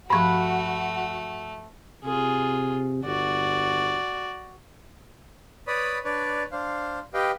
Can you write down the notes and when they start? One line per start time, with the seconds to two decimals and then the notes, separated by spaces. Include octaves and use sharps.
0.10 G2 F3 A3 F#4 B5 C#6 F#6
2.04 C3 F4 G#4
3.05 G1 F#4 D5
5.67 B4 C#5 D5 B5 D#6
6.05 D4 B4 C#5 D5
6.52 D4 C5 F5
7.14 G4 B4 D#5 F5 G5